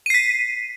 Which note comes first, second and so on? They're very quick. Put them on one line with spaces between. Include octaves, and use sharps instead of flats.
D#7 C7 B6